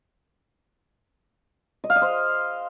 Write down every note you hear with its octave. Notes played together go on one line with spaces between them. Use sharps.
D#5
F5
D#5
C5